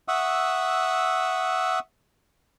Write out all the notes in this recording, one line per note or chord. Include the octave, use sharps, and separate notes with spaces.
E5 F#5 C#6 D#6 E6